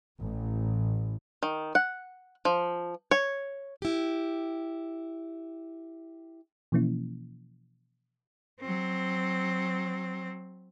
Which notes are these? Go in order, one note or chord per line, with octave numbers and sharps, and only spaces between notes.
A1
D#3
F#5
F3
C#5
E4 G4
B2 E3 F3 A#3 C#4 E4
F#3 C4